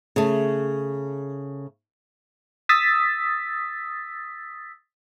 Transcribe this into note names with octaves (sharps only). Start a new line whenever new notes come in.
C#3 A3
D#6 E6 A6 B6